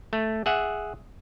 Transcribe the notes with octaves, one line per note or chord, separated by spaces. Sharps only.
A3
G#4 E5 F#5